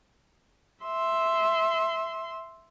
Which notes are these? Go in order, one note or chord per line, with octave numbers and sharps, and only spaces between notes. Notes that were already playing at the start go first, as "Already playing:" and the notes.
E5 C6